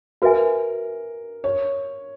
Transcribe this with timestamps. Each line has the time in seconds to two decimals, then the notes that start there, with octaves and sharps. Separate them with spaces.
0.22 F#4 A#4 B4 E5 G#5
1.44 C#5